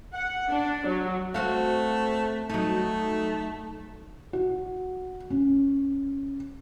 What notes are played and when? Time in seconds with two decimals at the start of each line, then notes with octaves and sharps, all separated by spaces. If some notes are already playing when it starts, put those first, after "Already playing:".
0.14 F#5
0.51 D4
0.87 F#3
1.34 A3 C4 F#4 F5
2.50 F#3 A3 D#4
4.33 F#4
5.30 C#4